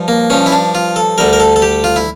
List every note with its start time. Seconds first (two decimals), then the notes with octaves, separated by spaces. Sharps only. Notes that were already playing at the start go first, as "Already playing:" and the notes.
Already playing: G2 F3
0.08 A#3
0.30 G2 F3 C#4
0.46 E4
0.52 D4
0.75 F4
0.96 A4
1.18 D2 D3 G3 A#4
1.33 A#4
1.40 A4
1.56 A4
1.62 G4
1.84 F4
1.96 E4